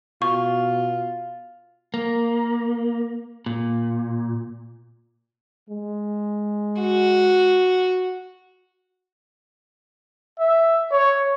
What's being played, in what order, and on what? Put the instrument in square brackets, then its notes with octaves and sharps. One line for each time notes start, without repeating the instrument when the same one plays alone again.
[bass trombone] B2 [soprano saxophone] F4 [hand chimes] F5 [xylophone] C#6
[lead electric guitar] A#3
A#2
[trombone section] G#3
[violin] F#4
[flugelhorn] E5
C#5